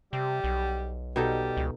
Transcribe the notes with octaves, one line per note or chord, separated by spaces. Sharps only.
C3 G3
B1
B2 G3 D#4 A4
C#2